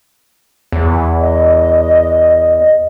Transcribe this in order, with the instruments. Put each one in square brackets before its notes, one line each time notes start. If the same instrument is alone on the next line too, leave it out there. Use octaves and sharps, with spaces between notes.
[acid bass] E2
[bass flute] D#5